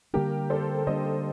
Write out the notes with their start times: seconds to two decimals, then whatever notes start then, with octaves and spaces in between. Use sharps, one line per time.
0.13 D3 G3 A#3 D4 G4 A#4
0.50 A4 C5
0.87 D3 G3 A#3 D4 C5 D#5